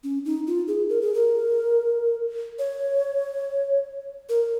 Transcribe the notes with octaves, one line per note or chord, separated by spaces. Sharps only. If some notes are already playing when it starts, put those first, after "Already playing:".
C#4
D#4
F4
G#4
A#4
G#4
A#4
C#5
A#4